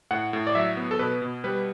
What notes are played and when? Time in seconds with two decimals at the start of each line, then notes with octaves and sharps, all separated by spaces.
0.11 A2 F#5
0.33 A2
0.47 D5
0.55 F#3 E5
0.77 B3
0.91 A4
0.99 B2 B4
1.22 B2
1.44 G3 B4